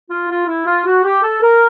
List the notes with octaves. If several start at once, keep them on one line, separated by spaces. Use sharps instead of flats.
F4
F4
E4
F4
F#4
G4
A4
A#4